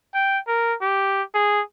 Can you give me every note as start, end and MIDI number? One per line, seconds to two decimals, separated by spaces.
0.14 0.39 79
0.47 0.75 70
0.82 1.22 67
1.34 1.61 68